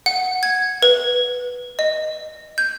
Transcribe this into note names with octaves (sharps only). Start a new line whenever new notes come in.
F#5
G#6
B4
D#5
G6